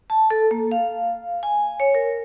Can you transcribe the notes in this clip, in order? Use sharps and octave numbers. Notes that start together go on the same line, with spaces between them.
A5
A4
A#3
F5
G#5
C#5
A#4